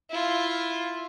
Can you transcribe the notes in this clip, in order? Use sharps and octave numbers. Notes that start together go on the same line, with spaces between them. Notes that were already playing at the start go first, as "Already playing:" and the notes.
E4 F4